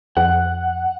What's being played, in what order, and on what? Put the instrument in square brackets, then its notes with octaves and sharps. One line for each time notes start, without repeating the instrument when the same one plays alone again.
[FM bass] F2 [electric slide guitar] F#5